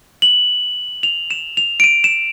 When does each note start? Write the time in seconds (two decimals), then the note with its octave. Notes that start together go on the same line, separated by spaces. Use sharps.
0.22 F#7
1.03 F7
1.31 E7
1.57 F7
1.80 D7
1.84 D#7
2.04 E7